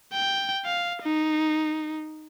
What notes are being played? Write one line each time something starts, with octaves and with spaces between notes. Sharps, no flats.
G5
F5
D#4